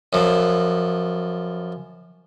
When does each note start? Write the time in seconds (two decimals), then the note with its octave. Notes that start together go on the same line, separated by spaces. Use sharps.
0.13 F#2 F3